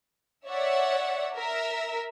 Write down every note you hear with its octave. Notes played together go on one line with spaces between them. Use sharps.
C#5 D5 E5 F#5
A#4 E5